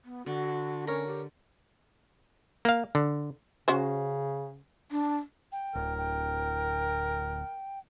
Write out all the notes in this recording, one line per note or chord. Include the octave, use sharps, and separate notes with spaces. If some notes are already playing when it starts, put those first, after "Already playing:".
B3
D3 F#4
C#4 A#4 C#5
G4
A#3 F5
D3
C#3 C#4 F#4 C5
D4
G5
D1 A#4
G5